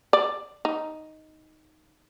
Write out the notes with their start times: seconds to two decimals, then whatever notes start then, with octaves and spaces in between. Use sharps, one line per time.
0.13 D5
0.65 D#4